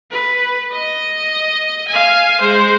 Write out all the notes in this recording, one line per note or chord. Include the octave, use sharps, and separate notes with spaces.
B4
D#5
F5 G#5
G#3 C5